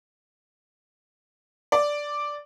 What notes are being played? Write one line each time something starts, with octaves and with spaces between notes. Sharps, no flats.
D5